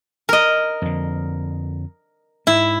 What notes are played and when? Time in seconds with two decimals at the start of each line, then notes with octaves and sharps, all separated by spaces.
0.29 A#4 D#5
0.82 F2 D3
2.47 G#2 E4